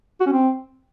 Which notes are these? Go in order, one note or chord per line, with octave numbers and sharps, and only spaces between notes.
F#4
C#4
C4